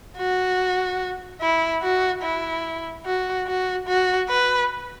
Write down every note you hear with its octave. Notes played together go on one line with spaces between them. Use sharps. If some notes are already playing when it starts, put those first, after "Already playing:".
F#4
E4
F#4
E4
F#4
F#4
F#4
B4